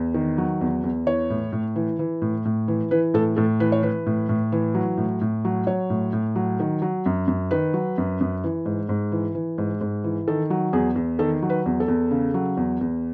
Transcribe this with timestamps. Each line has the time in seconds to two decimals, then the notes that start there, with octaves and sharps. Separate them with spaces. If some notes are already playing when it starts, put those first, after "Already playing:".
Already playing: E2
0.14 D#3
0.38 F#3
0.61 E2
0.84 E2
1.06 E3 C#5
1.30 A2
1.52 A2
1.76 E3
1.99 E3
2.22 A2
2.45 A2
2.68 E3
2.91 E3 B4
3.14 A2 A4
3.37 A2 A4
3.60 E3 B4
3.72 C#5
3.83 E3 B4
4.06 A2
4.29 A2
4.52 E3
4.75 F#3
4.98 A2
5.21 A2
5.45 F#3
5.67 F#3 C#5
5.90 A2
6.13 A2
6.36 F#3
6.60 D#3
6.82 F#3
7.06 F#2
7.28 F#2
7.51 D#3 B4
7.74 F#3
7.98 F#2
8.21 F#2
8.44 E3
8.66 G#2
8.89 G#2
9.12 E3
9.35 E3
9.58 G#2
9.81 G#2
10.04 E3
10.28 D#3 A4
10.50 F#3
10.73 E2 G#4
10.96 E2
11.19 D#3 A4
11.42 F#3
11.50 B4
11.66 E2
11.80 A4
11.88 E2
12.11 C#3
12.34 F#3
12.57 E2
12.81 E2